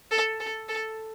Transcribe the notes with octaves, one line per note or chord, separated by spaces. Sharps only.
A4
A4
A4